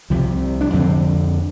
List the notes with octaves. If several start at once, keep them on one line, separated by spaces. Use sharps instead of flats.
C2 C3 F3
D4
F2 D3 C4